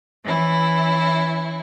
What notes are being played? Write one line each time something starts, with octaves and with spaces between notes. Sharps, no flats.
E3 C#4 E4